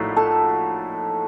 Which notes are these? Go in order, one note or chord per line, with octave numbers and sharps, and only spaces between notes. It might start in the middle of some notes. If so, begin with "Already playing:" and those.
Already playing: A#1 A2 A3 D#4 F#4 F#5
A4 A5